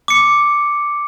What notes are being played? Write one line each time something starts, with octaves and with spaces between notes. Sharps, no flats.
D6 C#7